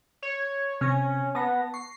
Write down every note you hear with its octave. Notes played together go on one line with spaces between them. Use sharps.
C#5
C3 C#4 G#6 A#6
B3 A5 A#6
C#6 C7